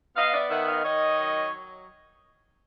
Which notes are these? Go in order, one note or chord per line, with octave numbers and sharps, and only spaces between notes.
B3 D#5 F5
D5 E5
D#3 E5 F#5
D#5 F5
D#3 C#5 D#5
F#3